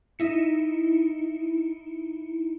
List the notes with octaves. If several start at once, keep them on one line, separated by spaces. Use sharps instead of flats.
D#4 E4 C#7